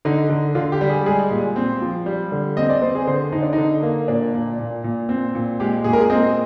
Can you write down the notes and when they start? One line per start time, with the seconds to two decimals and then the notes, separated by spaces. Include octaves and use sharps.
0.05 D3 D#4
0.30 D3
0.55 D3 F4
0.72 G4
0.81 G3
0.90 G#4
1.06 G#3 G#4
1.31 A#2
1.56 C4
1.81 F3
2.06 G3
2.32 D3
2.57 C4 D#5
2.70 D5
2.82 C4 C5
2.95 G#4
3.07 D3 C5
3.32 D3 D#4
3.43 D4
3.53 D#4
3.58 D3
3.83 A#3
4.08 A#2 D4
4.34 A#2
4.59 A#2
4.84 A#2
5.09 C4
5.35 A#2
5.60 G#3 G4
5.84 A#2 G#4
5.93 A#4
6.01 G#4
6.10 C4 D#5